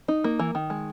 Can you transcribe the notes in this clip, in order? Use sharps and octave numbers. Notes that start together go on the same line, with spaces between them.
D#4
A#3
E3
D#3
G#3